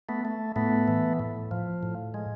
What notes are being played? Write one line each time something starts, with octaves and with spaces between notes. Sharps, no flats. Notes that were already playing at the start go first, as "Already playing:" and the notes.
A3 B3
A3
A2 A3 B3
E3
A2
F3
A2
G#3